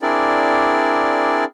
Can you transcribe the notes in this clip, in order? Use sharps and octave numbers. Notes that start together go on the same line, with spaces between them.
C4 D4 E4 G#4 A#4 D5